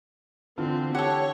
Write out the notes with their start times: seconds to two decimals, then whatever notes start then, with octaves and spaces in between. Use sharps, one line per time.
0.58 D3 E3 C4 F4
0.95 G4 A4 C#5 F#5